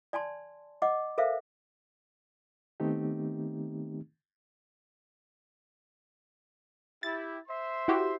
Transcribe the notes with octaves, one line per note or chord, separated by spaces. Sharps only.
D5 G#5 A5 C6
D#5 F#5 D6
A4 A#4 C5 E5 F5
D#3 A3 B3 C4 D#4 G4
E4 G4 A6
C5 E5 C6
E4 F#4 G4